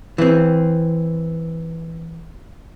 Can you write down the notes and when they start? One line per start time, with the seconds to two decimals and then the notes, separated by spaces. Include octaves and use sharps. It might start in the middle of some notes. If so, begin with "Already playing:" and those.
0.18 E3 C4